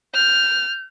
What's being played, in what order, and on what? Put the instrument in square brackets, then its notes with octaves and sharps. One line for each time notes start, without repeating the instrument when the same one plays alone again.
[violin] F6 [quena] G6